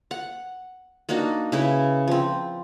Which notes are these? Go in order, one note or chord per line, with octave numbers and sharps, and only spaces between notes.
F#5
A#3 D4 D#4 F#4
C#3 E4 B4
F3 C4